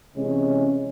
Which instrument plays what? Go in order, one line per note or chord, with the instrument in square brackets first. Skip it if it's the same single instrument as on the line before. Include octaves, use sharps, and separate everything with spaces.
[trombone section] C3 E3 G#3 C#4